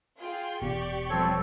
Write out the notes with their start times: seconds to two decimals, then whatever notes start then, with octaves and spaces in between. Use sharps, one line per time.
0.20 F4 G#4 G5
0.61 E1 B3 G4 D5 C#6
1.10 F3 G3 C4 A4 C#5